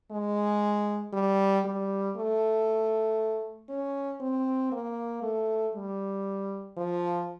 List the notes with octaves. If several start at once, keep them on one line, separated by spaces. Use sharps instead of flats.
G#3
G3
G3
A3
C#4
C4
A#3
A3
G3
F3